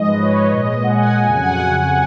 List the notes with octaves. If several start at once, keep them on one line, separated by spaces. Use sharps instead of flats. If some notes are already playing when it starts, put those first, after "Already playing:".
Already playing: G#2 F3 G#3 D#5
B4
C#5
A#2 G#3 D#5
F#5
G#5
F2 C#3 F#3 G#5
F#5
G#5